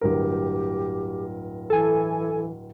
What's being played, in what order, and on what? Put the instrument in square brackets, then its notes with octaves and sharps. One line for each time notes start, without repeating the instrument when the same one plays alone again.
[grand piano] D1 G2 A#4 [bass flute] G4
[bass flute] E3 [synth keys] A4 G#5